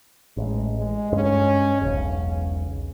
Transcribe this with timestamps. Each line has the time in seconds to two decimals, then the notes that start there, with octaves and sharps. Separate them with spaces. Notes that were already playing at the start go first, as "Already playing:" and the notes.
0.37 A1 G#3
0.77 G#3
1.12 G2 G#3 C#4
1.81 E1 B1 C#3